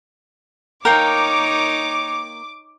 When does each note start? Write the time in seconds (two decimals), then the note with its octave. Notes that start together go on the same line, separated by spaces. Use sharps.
0.85 A#3 D#4 A#4 C#5 G5 A#5 D6